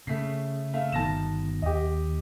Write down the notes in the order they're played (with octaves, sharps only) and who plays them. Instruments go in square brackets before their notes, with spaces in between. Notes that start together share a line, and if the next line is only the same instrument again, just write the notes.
[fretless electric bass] C#3 [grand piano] A3 B6 C7
[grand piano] A3 E5 F5
[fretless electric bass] G1 B2 D#3 [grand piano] A5 A#6 E7
[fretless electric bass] D#2 [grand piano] G4 D#5